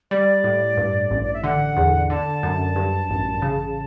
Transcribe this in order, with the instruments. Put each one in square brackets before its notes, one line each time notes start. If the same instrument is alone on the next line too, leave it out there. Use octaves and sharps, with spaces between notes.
[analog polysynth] G3 [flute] D5
[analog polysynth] A2
G2
A1
[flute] D5
E5
[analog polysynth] D3 [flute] F#5
[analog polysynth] E2
[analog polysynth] D3 [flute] A5
[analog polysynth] F#2
G2
A1
C#3